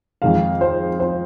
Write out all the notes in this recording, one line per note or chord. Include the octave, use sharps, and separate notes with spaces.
F2 D#3 G#3 F5
C5
C5